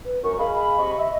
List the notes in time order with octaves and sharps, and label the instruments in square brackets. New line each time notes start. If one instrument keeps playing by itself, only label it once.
[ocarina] B4
[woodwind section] F#2 [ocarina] C#6
[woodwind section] G#4 D#5 F5 [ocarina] B5
[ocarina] B5
[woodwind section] C3 D#5 C#6
[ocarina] D#5 [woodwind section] E5